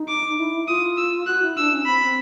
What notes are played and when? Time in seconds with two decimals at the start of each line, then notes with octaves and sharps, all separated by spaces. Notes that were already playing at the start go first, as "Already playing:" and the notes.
Already playing: D#4
0.08 D6
0.37 E4
0.67 F4 D#6
0.97 E6
1.26 F#4 F#6
1.42 E4
1.57 D4 E6
1.72 C#4
1.86 C4 B5
2.01 C4